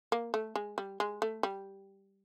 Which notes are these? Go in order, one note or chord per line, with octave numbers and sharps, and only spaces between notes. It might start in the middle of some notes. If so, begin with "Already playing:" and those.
A#3
A3
G#3
G3
G#3
A3
G3